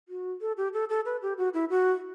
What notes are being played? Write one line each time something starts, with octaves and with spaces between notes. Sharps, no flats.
F#4
A4
G4
A4
A4
B4
G4
F#4
E4
F#4